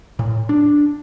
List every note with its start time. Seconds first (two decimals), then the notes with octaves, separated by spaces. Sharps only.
0.19 A2
0.49 D4